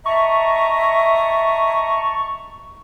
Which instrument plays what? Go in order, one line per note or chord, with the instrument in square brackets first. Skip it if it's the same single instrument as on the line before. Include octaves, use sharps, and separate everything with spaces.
[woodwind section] D#5 A5 A#5 [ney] E5 [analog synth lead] C#6